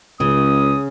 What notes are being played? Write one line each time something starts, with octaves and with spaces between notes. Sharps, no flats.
C#2 C#3 D#6